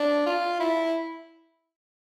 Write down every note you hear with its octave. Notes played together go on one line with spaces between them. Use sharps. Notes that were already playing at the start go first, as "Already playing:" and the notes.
Already playing: D4
F4
E4